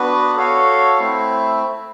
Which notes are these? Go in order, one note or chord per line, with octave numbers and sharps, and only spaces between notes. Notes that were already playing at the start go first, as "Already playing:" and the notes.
Already playing: B3 D4 F#4 B4
F#4 A4 C#5 F5
A3 C4 E4